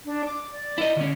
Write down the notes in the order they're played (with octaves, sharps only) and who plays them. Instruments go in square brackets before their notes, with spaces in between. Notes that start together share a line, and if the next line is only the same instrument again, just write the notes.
[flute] D4
D6
D5
[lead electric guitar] E4 D#5
D3 C#4